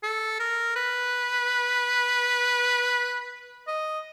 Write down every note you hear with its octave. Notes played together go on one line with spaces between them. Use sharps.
A4
A#4
B4
D#5